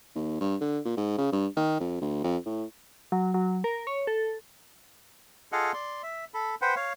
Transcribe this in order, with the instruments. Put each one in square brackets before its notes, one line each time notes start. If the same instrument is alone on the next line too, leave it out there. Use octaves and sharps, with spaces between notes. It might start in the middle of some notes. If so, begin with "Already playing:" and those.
[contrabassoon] D#2
G2
D3
A#2
G#2
C#3
G2
D#3
F2
D2
F2
A2
[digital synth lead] F#3
F#3
A#4
C#5
A4
[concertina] F4 G#4 A4 D#5 F5 F#5
D5 C6
E5
A4 B5
B4 C5 F#5 G5
C#5 F5